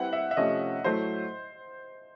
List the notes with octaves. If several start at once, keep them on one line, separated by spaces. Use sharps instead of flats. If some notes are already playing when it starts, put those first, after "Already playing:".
Already playing: G3 C4 E4 G4 B4 F#5
E5
E5
C3 F3 A3 C#4 D#5
A2 F#3 A3 C5